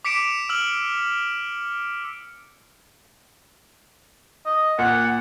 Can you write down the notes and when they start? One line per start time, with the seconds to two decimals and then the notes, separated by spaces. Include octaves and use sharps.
0.05 D6 B6 C#7 D7 E7
0.49 E6 F6 F#7
4.46 D#5
4.79 A#2 F#5